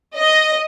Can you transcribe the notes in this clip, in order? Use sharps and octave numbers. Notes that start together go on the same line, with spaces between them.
D#5